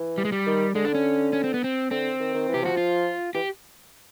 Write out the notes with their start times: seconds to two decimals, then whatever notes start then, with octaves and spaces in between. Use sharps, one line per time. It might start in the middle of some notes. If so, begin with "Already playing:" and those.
Already playing: E3
0.18 G3
0.25 G#3
0.32 G3
0.47 D#3
0.75 D3 G#3
0.85 D4
0.95 C#4
1.33 C#4
1.44 C4
1.54 B3
1.64 C4
1.91 D3 C4
2.20 D#3
2.34 D#3
2.49 E3
2.54 G4
2.63 F3 F#4
2.77 F4
3.35 E3 G4